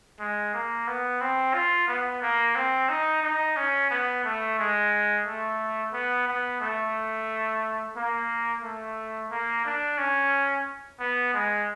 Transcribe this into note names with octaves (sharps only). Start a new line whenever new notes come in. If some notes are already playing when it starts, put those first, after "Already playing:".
G#3
A#3
B3
C4
F4
B3
A#3
C4
D#4
D#4
C#4
B3
A3
G#3
A3
B3
B3
A3
A#3
A3
A#3
D4
C#4
B3
G#3